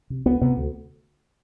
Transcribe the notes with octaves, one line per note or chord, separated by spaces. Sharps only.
C3
D2 B3
C3 B3
D2